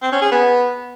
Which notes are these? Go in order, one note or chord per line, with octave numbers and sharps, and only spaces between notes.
C4
C#4
G#4
B3